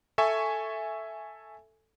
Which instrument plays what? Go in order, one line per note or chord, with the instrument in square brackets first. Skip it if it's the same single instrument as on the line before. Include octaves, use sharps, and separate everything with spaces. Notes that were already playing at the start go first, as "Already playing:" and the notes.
[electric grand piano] A4 E5 G#5 C#6